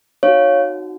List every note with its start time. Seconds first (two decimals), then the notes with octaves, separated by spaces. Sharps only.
0.23 C4 D#4 F#4 C#5 F5